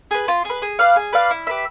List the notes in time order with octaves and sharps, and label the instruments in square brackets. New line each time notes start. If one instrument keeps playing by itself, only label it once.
[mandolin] G#4 B4
F4
G#4 B4
G#4
B4 D5 F5
G#4
B4 D5 F5
E4
G4 B4 E5